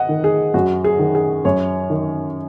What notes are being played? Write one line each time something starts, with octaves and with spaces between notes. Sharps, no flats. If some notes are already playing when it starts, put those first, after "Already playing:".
Already playing: D#5 F#5
D#3
G#4
F#2 F#4
G#4
D#3
G#4
F#2 C#5
D#3